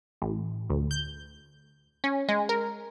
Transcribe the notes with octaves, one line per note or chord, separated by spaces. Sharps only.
A1
D2
G6
C#4
G#3
A#4